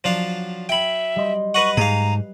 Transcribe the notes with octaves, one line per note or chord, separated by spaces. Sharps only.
F3 F#3 D4 F5
E5 G5 G#5 B5 C#7 E7
G3 D#5 C6
B4 D#5 F#5 C#6
G#2 G#4 B4 F5 A#5